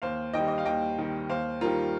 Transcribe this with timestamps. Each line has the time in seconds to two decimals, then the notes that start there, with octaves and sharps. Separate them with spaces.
0.02 D#2 C5 F5
0.33 D#3 G3 D#5 G5
0.48 D#5
0.58 F5
0.65 D#2 D#5 G5
0.98 D#3 G3
1.29 D#2 C5 F5
1.61 D#3 G3 F4 A#4